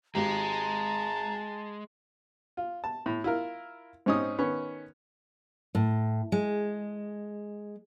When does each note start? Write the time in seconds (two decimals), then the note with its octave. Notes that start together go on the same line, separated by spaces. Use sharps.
0.15 G#1 G#3 G4 A5 A#5
2.57 F4
2.84 A5
3.06 A2
3.24 E4 F4 A#4
4.06 G#2 C4 C#4 D#4 D#6
4.38 D#3 B3 C#4
5.75 A2
6.32 G#3